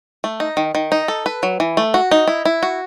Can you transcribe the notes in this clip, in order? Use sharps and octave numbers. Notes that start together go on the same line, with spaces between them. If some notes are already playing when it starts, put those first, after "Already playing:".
A3
D#4
D#3
D#3
D#4
A4
B4
F#3
E3
A3
F#4
D#4
E4
E4
F#4